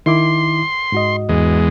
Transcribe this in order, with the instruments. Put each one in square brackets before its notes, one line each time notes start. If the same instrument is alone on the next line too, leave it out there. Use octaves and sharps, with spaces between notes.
[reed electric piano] D#3 E4 D6 [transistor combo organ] C6
[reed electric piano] G#2 F#4 D#5
[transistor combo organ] E2 G#3